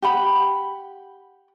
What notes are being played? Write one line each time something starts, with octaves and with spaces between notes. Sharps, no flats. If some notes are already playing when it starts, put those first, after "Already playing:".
G4 F#5 B5